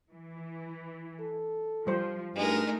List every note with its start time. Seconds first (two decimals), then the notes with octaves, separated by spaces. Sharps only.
0.11 E3
1.20 A4
1.87 F3 G3 C5
2.35 G2 G#3 A3 D#4 A#4